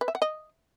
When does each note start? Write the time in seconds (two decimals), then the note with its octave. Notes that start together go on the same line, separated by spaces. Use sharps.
0.01 B4
0.08 E5
0.15 F#5
0.22 D#5